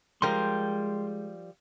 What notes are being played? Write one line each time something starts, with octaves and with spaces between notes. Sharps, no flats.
F3 G3 G#3 A#4 G5 C6